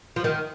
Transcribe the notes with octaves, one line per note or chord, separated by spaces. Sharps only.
F3
D#3